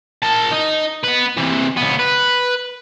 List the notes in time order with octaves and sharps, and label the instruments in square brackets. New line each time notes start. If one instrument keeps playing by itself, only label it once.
[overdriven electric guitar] A#4 A5
D#4
B3 B4
C3 E3
C#2 B3
B4